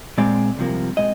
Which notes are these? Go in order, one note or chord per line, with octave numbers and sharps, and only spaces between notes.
A#2 G#3 C4 D5
C2 C3 F3 A#3
A#2 G#3 C4 D#5